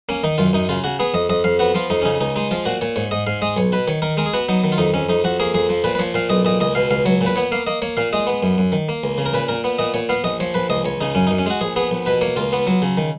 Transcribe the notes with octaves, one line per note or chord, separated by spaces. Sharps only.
A#3 C#4
D#3 D#4
F#2 F4
F#2 D#4
C#3 F4
C#3 F#4
B3 G#4
F2 D#5
F2 D#5
F2 F5
B3 F#4
F3 F4
F2 D#4
C#4
C#3 D#4
C#2 D#4
G#3 D#4
F3 F4
A#2 F#4
A#2 C#5
G#2 C#5
G#2 D#5
G#2 F5
G#3 D#5
B1 C#5
B2 B4
D#3 C#5
D#3 A#4
G#3 A#4
G#4
B3 F#4
F#3 D#4
D#3
F4
F2 D#4
F2 C#4
F2 D#4
F2 F#4
A#3 G#4
F2 G#4
F3
A#2 B4
B4
F3 C#5
A#2 F5
B1 D#5
A#2 D#5
C#2 D#5
B2 F5
C#2 F5
F#3 C#5
A#2
B4
B3 C#5
A#3 F5
A#3 D#5
A#3 C#5
A#2 F5
G#3 D#5
B3
F#2
F#2
D#3
A#3
C#2
C#3
A#4
A#2 B4
A#2 A#4
B3
A#2 D#5
A#2 C#5
B3 F5
A#1 D#5
F3 C#5
A#1 B4
C#2 D#5
C#2 C#5
C#3 D#4
F#2 C#4
D#4
F#2
C#4
G#3 F#4
A#1 G#4
B3 G#4
A#1
B2 B4
A#3 C#5
C#2 F4
B3
F#3
C#3
D#3